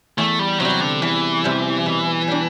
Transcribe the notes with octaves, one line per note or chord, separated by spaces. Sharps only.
E2 A3
G3
C3 F#3
G3
D3
E2 E3
C3 G3
B2
G3 D4